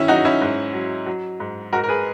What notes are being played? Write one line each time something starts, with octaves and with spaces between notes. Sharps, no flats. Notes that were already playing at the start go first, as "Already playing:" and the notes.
Already playing: D#3 C#4 E4
F#3 D#4 F#4
C#4 E4
G#2
F#3
F#3
G#2
G#2 F#4 A#4
A#4
G#4 B4